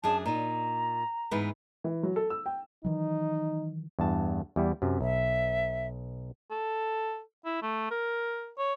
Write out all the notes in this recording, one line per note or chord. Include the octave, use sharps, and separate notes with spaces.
F#2 D4 G#4 A5
A#2 D#4 A#5
G#2 E3 B3
E3
F#3
A4
E6
G5
D#3 E3 F#3 D#4
E2 G2 A5
E2 G3 E4
F#2 C3
B1 E5
A4
E4
A3
A#4
C#5